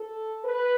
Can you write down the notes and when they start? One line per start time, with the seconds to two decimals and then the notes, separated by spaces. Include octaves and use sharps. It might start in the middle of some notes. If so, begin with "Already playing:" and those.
Already playing: A4
0.44 B4